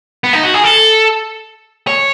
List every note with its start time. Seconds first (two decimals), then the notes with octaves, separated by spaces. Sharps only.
0.24 B3
0.33 D#4
0.43 F#4
0.54 G#4
0.64 A4
1.87 C#5